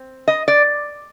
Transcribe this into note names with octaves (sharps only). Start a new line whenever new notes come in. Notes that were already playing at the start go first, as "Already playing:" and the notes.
Already playing: C4
D#5
D5